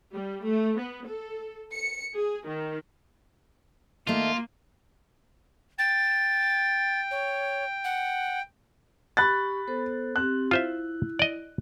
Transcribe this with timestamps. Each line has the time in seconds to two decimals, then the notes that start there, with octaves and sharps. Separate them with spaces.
0.13 G3
0.44 A3
0.78 B3
1.07 A4
1.72 C#7
2.16 G#4
2.49 D#3
4.07 D#3 A3 A#3 F4
5.79 G5 A6
7.11 C#5
7.84 F#5
9.17 G4 B5 C#6 F#6 A6
9.67 B3 A4 C5
10.16 C4 G4 F#6
10.51 E4 F4 C5 E5
11.19 D5 D#5